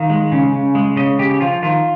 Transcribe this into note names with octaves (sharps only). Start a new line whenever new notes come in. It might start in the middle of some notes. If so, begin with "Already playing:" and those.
Already playing: D#3 F5
G#3
C#3
C#3
G#3
C#3 D#5
C#3 G4
G4
F3 F4
D#3 F4